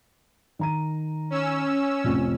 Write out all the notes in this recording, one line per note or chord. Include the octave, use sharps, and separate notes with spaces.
D#3 A#5 D#7
C#4 E6
A1 F2 C3